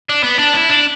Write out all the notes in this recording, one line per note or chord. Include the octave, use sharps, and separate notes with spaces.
D4
B3
D4
E4
D4